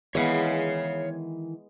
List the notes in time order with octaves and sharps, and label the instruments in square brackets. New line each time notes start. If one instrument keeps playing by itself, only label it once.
[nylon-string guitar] D#3 E3 F#5 [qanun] G#3 B3 E4 [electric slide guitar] C#5 F5